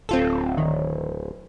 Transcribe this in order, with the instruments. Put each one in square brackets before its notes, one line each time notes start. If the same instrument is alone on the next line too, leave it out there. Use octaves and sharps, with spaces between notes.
[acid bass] D1 [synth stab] C4 F4 A4
[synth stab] D#3